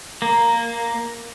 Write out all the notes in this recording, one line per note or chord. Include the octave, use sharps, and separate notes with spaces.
A#3